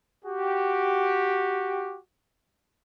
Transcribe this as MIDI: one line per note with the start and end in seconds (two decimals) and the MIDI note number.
0.25 1.97 66
0.25 1.97 67